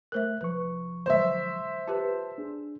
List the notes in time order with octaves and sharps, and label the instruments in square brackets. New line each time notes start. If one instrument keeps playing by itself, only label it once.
[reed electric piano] A3 F#6 [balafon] A#4 C5 E5
[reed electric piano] C2 F3 C#6 [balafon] B4
[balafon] D3 F#3 G#3 [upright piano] C5 E5
[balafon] F4 G4 B4 [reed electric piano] A5
[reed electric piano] D4 G#4